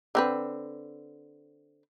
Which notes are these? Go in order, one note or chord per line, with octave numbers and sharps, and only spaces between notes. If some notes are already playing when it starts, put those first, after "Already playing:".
D3 C4 B4